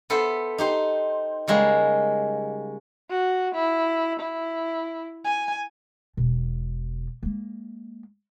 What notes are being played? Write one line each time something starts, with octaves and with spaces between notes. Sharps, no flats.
B3 A4 C5 E5
D#4 G4 C5
C#3 G3 G#3 A#3
F#4
E4
E4
G#5
E1 B2
G#3 A#3